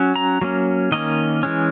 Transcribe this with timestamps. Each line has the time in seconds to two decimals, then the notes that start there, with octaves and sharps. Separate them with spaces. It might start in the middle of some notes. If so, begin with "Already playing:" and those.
Already playing: F#3 C#4
0.16 A#5
0.41 F#3 A#3 C#4
0.92 D#3 A#3 C#4 D#5
1.43 E3 G#3 C#4